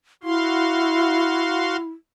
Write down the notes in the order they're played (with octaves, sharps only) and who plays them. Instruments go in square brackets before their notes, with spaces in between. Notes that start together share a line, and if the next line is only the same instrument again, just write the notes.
[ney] E4 [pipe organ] F#4 F5 C6